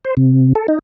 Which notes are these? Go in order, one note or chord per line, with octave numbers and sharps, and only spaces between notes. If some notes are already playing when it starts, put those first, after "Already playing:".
C5
C3
A4
D#4